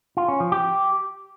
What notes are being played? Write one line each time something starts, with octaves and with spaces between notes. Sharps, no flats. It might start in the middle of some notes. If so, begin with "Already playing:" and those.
F4
C#4
F3
G4